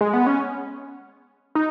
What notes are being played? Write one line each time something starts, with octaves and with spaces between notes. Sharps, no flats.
G#3
B3
C#4
D#4